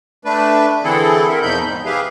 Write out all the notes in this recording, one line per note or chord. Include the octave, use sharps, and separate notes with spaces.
A3 D4 B4
D3 E3 C4 E4 G#4 A4
A#4 E5
E2 B2 F3 D#4 B5 G6
G#2
G4 G#4 B4 E5 F5